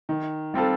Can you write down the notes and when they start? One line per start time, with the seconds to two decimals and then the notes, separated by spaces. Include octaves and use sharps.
0.09 D#3
0.54 G3 C4 F4 A4